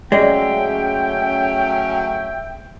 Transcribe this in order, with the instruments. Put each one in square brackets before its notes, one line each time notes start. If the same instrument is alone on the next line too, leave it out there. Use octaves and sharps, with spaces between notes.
[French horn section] F#3 A3 C#4 [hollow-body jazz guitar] G#3 [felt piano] D5 [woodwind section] E5 G5